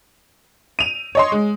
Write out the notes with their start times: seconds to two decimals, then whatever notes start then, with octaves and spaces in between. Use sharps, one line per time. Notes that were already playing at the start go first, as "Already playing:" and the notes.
0.79 D#7 F7
1.15 C#5 D#5 C6
1.32 G#3